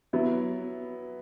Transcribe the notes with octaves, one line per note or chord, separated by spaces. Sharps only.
F#3 B3 E4